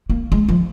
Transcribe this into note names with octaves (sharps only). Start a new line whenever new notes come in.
A#3
G#3
F3